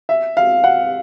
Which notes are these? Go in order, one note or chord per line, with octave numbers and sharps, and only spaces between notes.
E5
F5
F#5